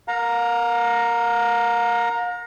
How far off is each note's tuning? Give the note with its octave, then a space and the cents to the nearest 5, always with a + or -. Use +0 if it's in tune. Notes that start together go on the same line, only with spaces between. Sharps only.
A#4 +0 F5 +40 A#5 +0